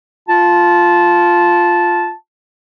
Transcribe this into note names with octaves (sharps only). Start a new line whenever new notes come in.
F4 A5